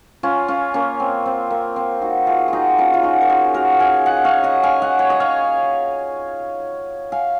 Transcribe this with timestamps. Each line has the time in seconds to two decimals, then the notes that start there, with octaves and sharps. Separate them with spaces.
0.23 C#4 F4
0.48 C#4 F4
0.74 A#3 C#4
1.00 C4
1.26 C4
1.51 A#3
1.76 C4
2.02 D#4 F#4
2.27 F4 G#4
2.48 D#4 F4 F#4
2.78 C#4 F4
2.94 F4
3.03 D#4 F#4
3.21 A#4
3.29 F4 G#4
3.54 F#4 A#4
3.80 F5 G#5
4.06 D#5 F#5
4.25 C#5 F5
4.43 D#5 F#5
4.63 F5 G#5
4.82 D#5 F#5
4.99 C#5
5.10 D#5
5.20 C#5 F5
7.12 F5 G#5